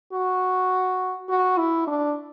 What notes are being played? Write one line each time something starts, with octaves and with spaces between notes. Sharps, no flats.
F#4
F#4
E4
D4